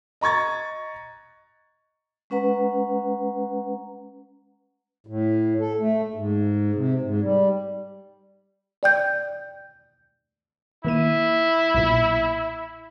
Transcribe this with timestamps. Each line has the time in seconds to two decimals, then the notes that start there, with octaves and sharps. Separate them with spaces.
0.21 D#5 A#5 C#6 G#6 A6
2.30 G#3 C#4 B4 F#5 A#5
5.07 A2
5.60 A4
5.80 A3
6.14 G#2
6.75 C3
7.02 G#2
7.22 G3
8.83 D5 G5 G6
10.85 D#3 A#3 E4 D#7
11.75 B1 A#2